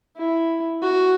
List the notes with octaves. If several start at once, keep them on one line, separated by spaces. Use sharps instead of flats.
E4
F#4